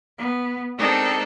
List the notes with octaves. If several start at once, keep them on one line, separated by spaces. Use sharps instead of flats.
B3
G#3 C4 D4 D#4 A4 A#4